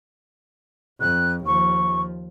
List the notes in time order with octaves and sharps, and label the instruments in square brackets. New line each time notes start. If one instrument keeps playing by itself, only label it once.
[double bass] F2 [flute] F#6
[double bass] D#2 F3 [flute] C#6